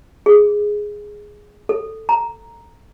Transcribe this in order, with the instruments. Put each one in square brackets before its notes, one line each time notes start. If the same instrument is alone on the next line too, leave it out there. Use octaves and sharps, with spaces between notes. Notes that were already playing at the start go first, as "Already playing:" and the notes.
[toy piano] G#4
A4
A#5